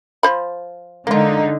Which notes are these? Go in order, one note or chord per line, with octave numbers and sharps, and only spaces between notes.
F3 C5 B5
D3 G#3 A#3 D#4 F4